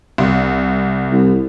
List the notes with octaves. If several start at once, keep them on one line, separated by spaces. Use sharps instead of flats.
C2
C2